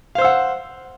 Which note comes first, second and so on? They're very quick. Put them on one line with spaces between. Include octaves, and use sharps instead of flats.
F5 C5 E6 F#5